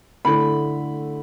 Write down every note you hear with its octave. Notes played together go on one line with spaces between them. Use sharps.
D3 A3 E4 B5